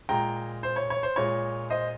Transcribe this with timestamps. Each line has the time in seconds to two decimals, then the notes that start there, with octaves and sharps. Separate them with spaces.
0.09 A#2 G#3 G5 A#5
0.63 C5
0.76 C#5
0.90 C#5
1.03 C5
1.16 A#2 G#3 C#5
1.70 C5 D#5